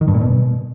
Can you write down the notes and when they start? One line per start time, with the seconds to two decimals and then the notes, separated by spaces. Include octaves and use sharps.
0.01 D#3
0.08 G2
0.14 A#2
0.21 B2